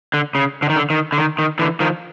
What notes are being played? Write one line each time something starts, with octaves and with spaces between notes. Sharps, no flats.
D3
C#3
D3
D#3
D3
D#3
D3
D#3
D#3
D3 E3
D#3 F3